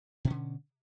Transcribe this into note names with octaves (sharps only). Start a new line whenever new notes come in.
B2 D3 C#4